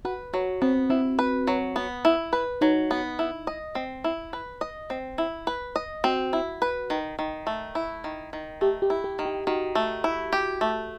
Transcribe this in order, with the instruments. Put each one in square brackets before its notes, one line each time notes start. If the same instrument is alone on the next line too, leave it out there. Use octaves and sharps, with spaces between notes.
[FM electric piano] F#4 [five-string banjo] B4
[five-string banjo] F#3 [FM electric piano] F#4
[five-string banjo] B3 [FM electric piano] C4
[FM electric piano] C4 [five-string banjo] E4
[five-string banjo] B4
F#3
B3
E4
B4
[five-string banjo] F#3 [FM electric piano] D#4
[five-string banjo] B3
E4
D#5
C4
E4
B4
D#5
C4
E4
B4
D#5
[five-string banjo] C4 [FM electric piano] F#4
[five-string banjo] E4
B4
D#3
D#3
A3
E4
D#3
D#3
[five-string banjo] A3 [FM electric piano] G4
[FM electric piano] G4
[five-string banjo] E4
[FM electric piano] G4
[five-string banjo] D#3
[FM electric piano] G4
[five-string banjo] D#3 [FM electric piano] F#4
[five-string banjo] A3
E4
G4
A3